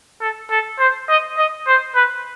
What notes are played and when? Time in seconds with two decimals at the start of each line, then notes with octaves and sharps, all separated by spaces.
0.21 A4
0.50 A4
0.79 C5
1.08 D#5
1.38 D#5
1.67 C5
1.95 B4